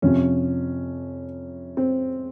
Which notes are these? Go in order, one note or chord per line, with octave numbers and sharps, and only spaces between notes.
F2 C3 F3 C#4
C4